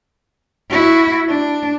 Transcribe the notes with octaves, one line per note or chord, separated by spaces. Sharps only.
E4 F#4
D4